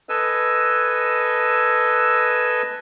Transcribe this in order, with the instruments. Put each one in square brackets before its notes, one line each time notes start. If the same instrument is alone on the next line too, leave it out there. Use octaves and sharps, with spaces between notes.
[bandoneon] A4 B4 D#5 G#5 E6